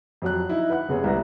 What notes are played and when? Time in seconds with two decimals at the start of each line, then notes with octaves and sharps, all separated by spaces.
0.22 F2 F#3 F#6
0.49 D#4 E4
0.70 B4 F#5 F#6
0.89 F#1 C3 B3 G#4 C#5
1.04 C2 E4 B4 A#6